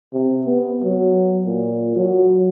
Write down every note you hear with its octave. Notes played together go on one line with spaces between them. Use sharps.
C3
B3
F#3
A#2
F#3